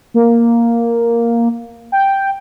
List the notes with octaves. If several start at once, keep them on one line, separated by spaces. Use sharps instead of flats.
A#3
G5